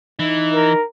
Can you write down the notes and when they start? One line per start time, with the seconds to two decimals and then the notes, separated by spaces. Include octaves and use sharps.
0.19 E3 D#4
0.54 A#4